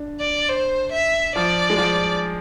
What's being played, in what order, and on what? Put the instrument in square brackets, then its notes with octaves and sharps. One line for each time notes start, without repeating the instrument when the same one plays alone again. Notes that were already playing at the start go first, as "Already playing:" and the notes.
Already playing: [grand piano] D4
[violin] D5
C5
E5
[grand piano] F3 [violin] D5
[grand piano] G#3
F3